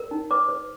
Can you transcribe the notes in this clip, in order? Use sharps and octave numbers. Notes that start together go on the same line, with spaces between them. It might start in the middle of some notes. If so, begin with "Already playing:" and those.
Already playing: A#4
D#4
B4 D6
B4